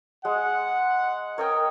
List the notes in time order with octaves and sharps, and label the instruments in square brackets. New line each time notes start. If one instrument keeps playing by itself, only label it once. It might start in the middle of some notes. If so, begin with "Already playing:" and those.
[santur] G#3 [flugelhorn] F#5
[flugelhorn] A#4 [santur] C#5 D#5 G5